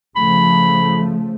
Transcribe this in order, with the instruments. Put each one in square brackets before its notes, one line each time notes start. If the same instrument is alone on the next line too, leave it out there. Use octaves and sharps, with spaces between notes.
[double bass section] C#3 F3 A3 [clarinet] B5